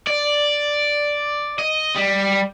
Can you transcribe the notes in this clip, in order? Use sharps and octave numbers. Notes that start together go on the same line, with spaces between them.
D5
D#5
G3